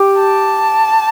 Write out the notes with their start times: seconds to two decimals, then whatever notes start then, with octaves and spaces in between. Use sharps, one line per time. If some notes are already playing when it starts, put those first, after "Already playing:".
Already playing: G4
0.17 A5